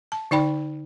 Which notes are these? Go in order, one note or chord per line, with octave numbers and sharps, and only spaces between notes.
A5
D3 D#4 D5 G5 B5